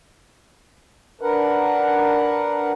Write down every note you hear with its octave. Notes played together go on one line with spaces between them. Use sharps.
D4 A#4 B4 F#5